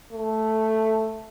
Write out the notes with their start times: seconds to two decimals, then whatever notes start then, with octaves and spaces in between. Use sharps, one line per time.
0.12 A3